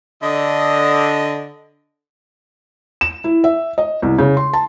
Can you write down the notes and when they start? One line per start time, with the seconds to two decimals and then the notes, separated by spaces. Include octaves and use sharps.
0.22 D3 D#5
3.01 E7
3.24 E4
3.44 E5
3.78 D#5
4.02 C2
4.18 C#3
4.37 C6
4.53 A5